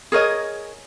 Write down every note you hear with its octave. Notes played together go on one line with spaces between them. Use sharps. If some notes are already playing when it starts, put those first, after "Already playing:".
G#4 A#4 C#5 D#5